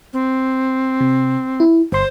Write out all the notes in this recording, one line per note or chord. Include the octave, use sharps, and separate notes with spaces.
C4
C3
E4
G1 C5 C6